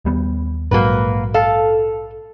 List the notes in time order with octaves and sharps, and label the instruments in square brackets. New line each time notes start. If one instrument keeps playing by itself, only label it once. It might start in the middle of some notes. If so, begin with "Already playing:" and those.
[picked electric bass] D#2 G3 B3
[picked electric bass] A#1 G#2 F#3 [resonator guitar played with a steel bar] A#3 F#4 B4
[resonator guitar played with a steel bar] A4 F5